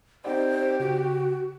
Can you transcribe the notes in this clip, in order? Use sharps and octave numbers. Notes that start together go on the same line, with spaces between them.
C4 D#4 G4 C5 D5
C#3 F#4